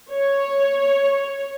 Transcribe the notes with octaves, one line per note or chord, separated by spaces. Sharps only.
C#5